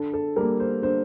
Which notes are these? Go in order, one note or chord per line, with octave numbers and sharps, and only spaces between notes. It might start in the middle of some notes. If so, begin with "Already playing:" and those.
Already playing: D3 A4
A4
G3 A#3 A#4
C5
D3 C5